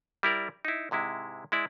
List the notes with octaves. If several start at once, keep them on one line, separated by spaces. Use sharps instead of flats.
G3 E4 A#4 D5
D#4 E4
G#2 C3 G#3 E4
G#3 E4 D5